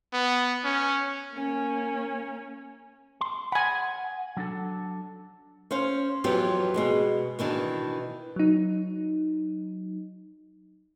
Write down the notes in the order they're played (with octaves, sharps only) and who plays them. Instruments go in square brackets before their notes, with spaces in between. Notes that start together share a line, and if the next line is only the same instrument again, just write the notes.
[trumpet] B3
C#4
[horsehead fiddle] A#3 C#4
[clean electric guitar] C6
[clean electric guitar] F#5 [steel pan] G#5 B5
[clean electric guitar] F#3 D4 A4
[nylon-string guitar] C#4 C5 F5
F2 E3 F#3 B3 F4 G4
B2 G#3 B3
B2 D#3 E3 D4
[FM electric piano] F#3 D#4